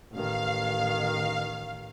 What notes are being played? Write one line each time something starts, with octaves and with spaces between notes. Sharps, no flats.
A1 D#3 F5